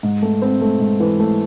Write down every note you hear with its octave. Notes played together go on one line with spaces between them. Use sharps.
G#2
A3
C4
A3
G#2
E3
A3